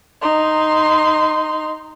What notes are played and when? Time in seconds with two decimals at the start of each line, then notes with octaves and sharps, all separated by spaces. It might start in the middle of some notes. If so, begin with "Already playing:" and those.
0.22 D#4 C6